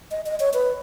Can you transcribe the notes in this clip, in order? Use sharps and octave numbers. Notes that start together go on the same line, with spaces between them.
D#5
D#5
C#5
B4